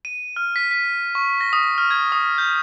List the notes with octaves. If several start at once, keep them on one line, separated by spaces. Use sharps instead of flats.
D#7
F6
B6
B6
C#6
A#6
D#6
F6
G#6
D#6
G6